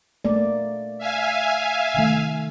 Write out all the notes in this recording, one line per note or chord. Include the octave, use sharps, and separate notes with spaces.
A3 A#3 D5
E5 F5 G#5
C3 D#3 A3